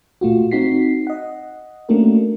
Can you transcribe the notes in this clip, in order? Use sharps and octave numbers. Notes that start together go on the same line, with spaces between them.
A#2 A3 F4 F#4
C4 D#4 F#4 B6 C7
D#5 F#5
A3 A#3 C#4 D4 F#4 A#4